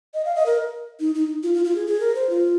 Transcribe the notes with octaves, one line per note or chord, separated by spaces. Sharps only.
D#5
F5
D#5
A#4
D#4
D#4
F4
F4
F4
G#4
G#4
A#4
C5
F4